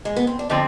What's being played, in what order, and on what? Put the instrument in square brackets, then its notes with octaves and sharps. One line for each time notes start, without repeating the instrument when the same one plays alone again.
[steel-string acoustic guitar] G#3
B3
C4
D4
[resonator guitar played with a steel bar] D3 F3 C4 [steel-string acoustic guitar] D#4